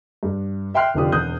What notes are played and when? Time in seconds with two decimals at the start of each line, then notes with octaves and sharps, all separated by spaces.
0.23 G2
0.74 E5 G5 C6 F6 F#6 C7
0.94 F1 D3 F3 D4 G4 D#6
1.12 E1 E2 D#6 F#6 G6